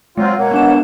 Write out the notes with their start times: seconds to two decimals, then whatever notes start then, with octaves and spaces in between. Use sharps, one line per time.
0.17 F#3 G#3 C4 F4
0.37 B2 A#3 C#5 F#5
0.51 B3 D4 E7